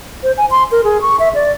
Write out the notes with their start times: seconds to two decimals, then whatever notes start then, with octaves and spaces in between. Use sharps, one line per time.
0.23 C5
0.38 G#5
0.51 C6
0.72 A#4
0.84 G#4
1.01 C#6
1.20 E5
1.35 D5